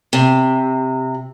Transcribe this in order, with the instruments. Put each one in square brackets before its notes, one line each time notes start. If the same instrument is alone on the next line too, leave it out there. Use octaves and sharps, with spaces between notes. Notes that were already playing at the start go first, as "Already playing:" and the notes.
[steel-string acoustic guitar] C3